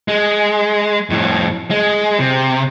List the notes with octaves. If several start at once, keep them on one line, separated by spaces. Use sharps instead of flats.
G#3
F2 A2
G#3
C3